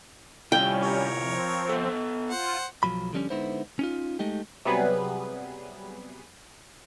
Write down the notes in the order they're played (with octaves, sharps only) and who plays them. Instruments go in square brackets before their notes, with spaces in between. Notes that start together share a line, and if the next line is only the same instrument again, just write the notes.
[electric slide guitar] C3 E4 F4 [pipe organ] G3 C#4 [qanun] G5
[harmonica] A#4 C#5
[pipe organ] F3 C4
[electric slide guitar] B3 A4
[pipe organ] F4 [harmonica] C5 F#5
[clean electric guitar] B1 F#2 F3 F#3 B5
D3 F3 G3 A3 C#4
D3 G#3 B3 D#4 E4 C5
C#4 D#4 F4
G#3 A3 D#4 G4
[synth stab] C3 F#3 G3 B3 G#4 B4